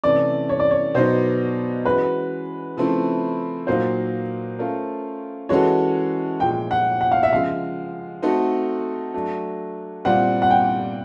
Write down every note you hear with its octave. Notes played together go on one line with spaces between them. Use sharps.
C3 E3 A3 C#4 D5
C#5
D5
C#5
B2 F#3 B3 D#4 C5
E3 G#3 C#4 F#4 B4
C#3 F3 A3 C4 E4
A#2 F#3 A#3 D#4 C5
A3 C#4 F4 A#4
E3 G#3 C#4 F#4 A4 C#5
A#2 F3 G#3 G5
F#5
F#5
F5
E5
C#3 F3 G#3 F5
A3 C4 D#4 F#4 A4
F#3 A3 D4
A#2 G3 C4 F4 F#5
F#5
G5